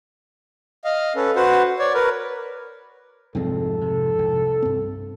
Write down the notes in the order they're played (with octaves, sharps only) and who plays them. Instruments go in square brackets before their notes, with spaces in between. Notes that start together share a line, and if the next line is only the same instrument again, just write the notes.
[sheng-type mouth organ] D#5 F5
C#4 A4 B4
F#4 B4 C5 F#5
C#5 D5
A#4 B4
[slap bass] C2 F3 C4 [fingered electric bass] F2 G#2 [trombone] A4
[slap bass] C3
C2
[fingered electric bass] G2 C4